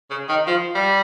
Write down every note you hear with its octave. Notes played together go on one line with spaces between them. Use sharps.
C#3
D#3
F3
G3